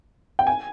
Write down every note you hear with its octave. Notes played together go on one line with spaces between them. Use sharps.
G5
G#5